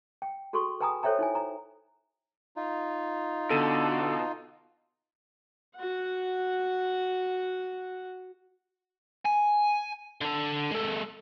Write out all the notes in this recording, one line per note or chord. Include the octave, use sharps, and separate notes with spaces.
G5
F#4 G#4 A4 C6 C#6
B4 G5 G#5 A#5 B5 D#6
A4 C5 C#5 E5 G5 A#5
D#4 E4 G#5
A#5
D#4 F4
B2 D3 A4 D#7
F#4 F#5
G#5
D3 A4
G#3 A4